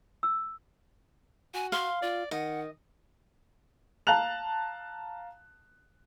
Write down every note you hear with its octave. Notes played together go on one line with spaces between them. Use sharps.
E6
F#4 G#5
F5 C6
F4 D5
D#3 D#5 F#5
F5 A5 A#5 F#6 F7